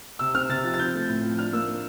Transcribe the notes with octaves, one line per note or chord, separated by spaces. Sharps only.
C3 E6
C4 F6
C3 A6
F3 A6
A6
C4 G6
A3
A2
F3
D4 F6
A#3 E6